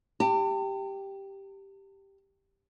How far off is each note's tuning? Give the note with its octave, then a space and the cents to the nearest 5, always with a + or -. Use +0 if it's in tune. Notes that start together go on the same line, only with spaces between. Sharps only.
G4 +0 A5 +45